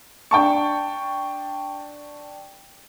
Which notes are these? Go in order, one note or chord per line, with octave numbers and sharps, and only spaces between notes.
D4 G5 A5 C#6